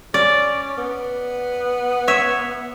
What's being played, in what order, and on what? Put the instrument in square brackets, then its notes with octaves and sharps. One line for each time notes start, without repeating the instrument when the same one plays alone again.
[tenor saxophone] C#4 [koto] D5
[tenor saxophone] B3
[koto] C#5 E5